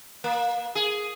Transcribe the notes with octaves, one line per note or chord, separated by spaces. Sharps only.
A#3
G#4